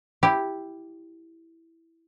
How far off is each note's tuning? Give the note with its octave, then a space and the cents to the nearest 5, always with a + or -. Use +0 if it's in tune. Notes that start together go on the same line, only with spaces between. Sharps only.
E4 +0 G4 +0